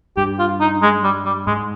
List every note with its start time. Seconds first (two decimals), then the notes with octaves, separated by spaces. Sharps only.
0.17 G2 G4
0.39 F4
0.60 D#4
0.82 G#3
1.04 G3
1.25 G3
1.47 G#2 G#3